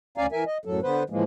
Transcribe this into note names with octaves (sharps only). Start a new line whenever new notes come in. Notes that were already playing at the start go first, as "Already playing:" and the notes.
D2 C#4 D5 F5 G#5 A#5
E3 A#4 E5 G#5
D#5
F#2 A2 F#3 A4
D3 B3 B4 C5
A2 E3 F3 G#3 A#3